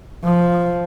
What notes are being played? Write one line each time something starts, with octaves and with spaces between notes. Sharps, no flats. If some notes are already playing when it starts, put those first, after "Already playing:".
F3